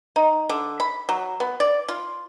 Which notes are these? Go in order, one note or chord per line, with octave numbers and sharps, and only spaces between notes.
D#4
D3
B5
F#3
B3
D5
F4